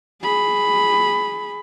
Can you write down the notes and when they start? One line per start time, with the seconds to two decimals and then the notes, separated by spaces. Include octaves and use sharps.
0.22 G#4 B5